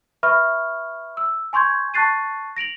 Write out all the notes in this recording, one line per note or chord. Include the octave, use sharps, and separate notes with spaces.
B4 E5 B5 C#6 F6
E6
G#5 C6 C#6 G6 G#6
A5 C#6 F#6 A6 C7 D#7
A#6 D7 F7 F#7